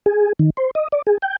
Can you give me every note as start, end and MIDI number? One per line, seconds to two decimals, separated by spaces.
0.06 0.33 68
0.39 0.50 51
0.57 0.71 72
0.75 0.88 75
0.92 1.02 74
1.07 1.18 68
1.22 1.36 79